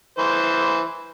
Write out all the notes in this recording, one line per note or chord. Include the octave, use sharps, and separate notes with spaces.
E3 C5